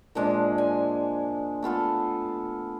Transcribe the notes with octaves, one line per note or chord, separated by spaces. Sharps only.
A#2 F3 G#3 D4
G#5
A3 B3 F4 A4